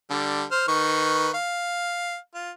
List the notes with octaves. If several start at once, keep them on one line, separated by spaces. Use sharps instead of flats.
D3 G3
C5 F6
D#3 B4 C#6
F5
F4